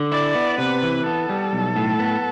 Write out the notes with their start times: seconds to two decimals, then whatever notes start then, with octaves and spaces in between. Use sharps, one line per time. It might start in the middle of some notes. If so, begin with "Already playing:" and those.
Already playing: D3
0.12 E4 D5
0.35 B3
0.58 C3 B4
0.83 E3
1.06 B3 A4
1.29 G3
1.53 B1
1.76 A2
1.99 B3